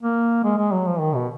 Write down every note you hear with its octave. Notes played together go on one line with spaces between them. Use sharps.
A#3
G#3
G#3
F#3
F3
D#3
B2